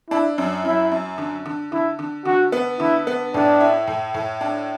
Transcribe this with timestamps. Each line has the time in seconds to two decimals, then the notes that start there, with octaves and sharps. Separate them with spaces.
0.11 D4 E4
0.38 F#2
0.65 F#2 E4
0.91 F#2
1.18 D3
1.46 D3
1.72 D3 E4
1.99 D3
2.25 D3 F#4
2.52 B3
2.80 D3 E4
3.07 B3
3.34 A2 D4
3.60 E4
3.87 A2
4.14 A2
4.41 D4